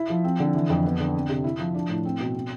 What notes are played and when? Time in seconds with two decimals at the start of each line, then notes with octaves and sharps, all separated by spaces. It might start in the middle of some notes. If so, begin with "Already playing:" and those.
Already playing: E4
0.10 F3
0.24 C4
0.40 D3
0.55 E3
0.70 F2
0.85 B3
1.00 D3
1.14 C4
1.29 C3
1.44 E4
1.60 F3
1.74 D4
1.90 A2
2.05 C4
2.20 B2
2.35 C4